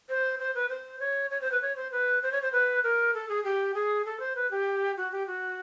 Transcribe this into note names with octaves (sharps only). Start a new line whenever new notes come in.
C5
C5
B4
C5
C#5
C#5
C5
B4
C#5
C5
B4
C5
C#5
C5
B4
A#4
A4
G#4
G4
G#4
A4
C5
B4
G4
F#4
G4
F#4